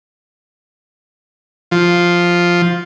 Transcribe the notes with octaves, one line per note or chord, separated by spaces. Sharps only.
F3